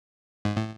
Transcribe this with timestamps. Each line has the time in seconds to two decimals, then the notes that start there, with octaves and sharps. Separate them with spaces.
0.45 G#2
0.56 A2